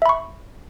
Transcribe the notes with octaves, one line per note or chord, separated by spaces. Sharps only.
E5 B5 C#6